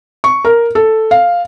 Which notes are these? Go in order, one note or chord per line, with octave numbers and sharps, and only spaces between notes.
C#6
A#4
A4
F5